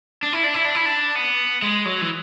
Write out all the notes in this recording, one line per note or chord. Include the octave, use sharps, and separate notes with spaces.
D4
E4
D4
E4
D4
E4
D4
B3
G#3
F#3
E3